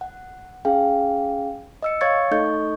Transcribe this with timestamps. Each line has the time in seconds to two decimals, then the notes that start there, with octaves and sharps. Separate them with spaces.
0.01 F#5
0.65 C#4 G#4 F5 G5
1.83 D#5 E6 C#7
2.01 C#5 F5 C#6 G#6 A6 C#7
2.31 A3 D#4 A4 D#5 C#6 G6